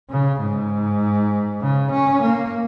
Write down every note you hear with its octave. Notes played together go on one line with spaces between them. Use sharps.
C#3
G#2
C#3
C#4
A#3